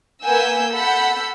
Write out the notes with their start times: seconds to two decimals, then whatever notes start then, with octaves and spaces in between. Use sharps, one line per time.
0.23 A#3 B4 F#5 G#5 E6 G6
0.72 A4 F#5 B5 E6 G6